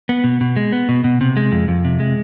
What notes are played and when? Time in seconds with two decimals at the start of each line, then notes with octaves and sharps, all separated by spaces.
0.09 B3
0.24 B2
0.41 B2
0.57 G#3
0.72 B3
0.89 B2
1.04 B2
1.21 C3
1.37 G#3
1.52 F2
1.68 F2
1.85 C3
2.00 G#3